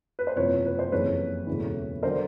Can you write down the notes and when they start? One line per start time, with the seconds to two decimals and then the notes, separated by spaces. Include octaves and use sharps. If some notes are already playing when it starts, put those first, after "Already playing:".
0.19 B4
0.27 C5
0.36 F#1 E2 C3 F3 B4 C#5
0.66 B4
0.79 C5
0.92 F#1 F2 C#3 E3 B4 C#5
1.47 E1 D2 C#3 E3
2.03 D3 F#3 A#4 C5